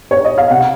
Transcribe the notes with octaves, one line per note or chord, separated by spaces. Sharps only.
C#5
D#5
F5
C3 F#5